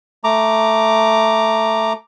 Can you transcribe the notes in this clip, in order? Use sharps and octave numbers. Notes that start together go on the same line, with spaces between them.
A3 A#5 D6